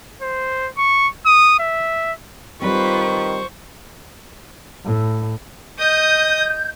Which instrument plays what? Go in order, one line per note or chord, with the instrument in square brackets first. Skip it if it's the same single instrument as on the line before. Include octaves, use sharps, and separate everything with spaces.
[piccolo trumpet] C5
C#6
D#6
E5
[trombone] D#3 [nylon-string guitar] G3 C4 [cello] F4 B4 [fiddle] C5 C#6
[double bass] A2
[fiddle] D#5 D#6 [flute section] G6